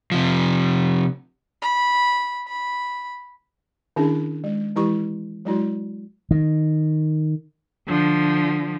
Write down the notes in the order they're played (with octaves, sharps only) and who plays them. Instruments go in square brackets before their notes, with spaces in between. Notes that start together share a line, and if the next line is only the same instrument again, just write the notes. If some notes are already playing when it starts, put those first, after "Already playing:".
[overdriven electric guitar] C3 F3
[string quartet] B5
B5
[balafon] D#3 C#4 D4 E4 G#4
G#3
E3 G#3 E4 G4 C#6
F#3 G#3 E4 F#4
[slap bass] D#3
[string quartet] D3 F3